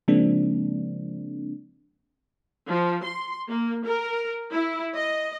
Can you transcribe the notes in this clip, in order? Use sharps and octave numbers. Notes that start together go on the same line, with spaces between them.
C#3 F3 G#3 A#3 C4 D4
F3
C6
A#3
A#4
E4
D#5